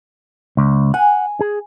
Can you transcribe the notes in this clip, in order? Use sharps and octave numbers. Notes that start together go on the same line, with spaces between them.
C#2
F#5 G#5
G#4